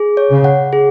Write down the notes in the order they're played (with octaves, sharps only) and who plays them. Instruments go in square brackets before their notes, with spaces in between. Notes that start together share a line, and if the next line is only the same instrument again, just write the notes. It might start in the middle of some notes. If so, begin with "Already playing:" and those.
Already playing: [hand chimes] G#4
C#5
[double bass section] C#3
[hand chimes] F#5
G#4